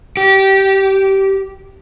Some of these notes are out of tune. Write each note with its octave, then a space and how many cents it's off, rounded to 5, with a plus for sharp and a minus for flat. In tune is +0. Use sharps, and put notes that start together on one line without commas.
G4 -20